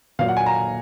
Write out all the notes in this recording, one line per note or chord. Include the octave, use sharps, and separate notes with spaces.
A#2 F#3 A#3 F5
F#5
G#5
A#5